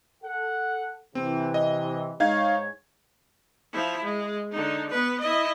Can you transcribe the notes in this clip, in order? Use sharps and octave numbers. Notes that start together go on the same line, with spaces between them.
A4 F#5
C3 E3 C4
D#5
G#2 G#3 D#4 C#5 F5 G#6
F3 E4
G#3
D3 D#4
B3 B4
E4 D#5